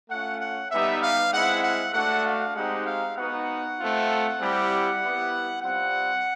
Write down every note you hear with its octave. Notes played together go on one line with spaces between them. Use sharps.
A3 C#4 F4 F#5
F#5
G3 B3 D#4 G4 E5
F5
G#3 C4 E4 F#5
F#5
A3 D4 F#4 F#5
F5
G#3 C4 D#4 G4 F#5
F5
B3 D#4 F#4 F#5
A3 C4 F4
G3 C4 E4 G4
B3 E4 G4
G3 C4 F4 F#5